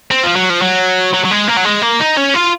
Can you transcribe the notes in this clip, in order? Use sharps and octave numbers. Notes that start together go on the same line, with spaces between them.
C4
F3
F#3
F3
F#3
F#3
F#3
G#3
A#3
F#3
G#3
A#3
D#4
C#4
F4